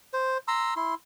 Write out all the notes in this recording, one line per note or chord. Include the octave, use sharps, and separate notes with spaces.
C5
A#5 C6 E6
E4 C6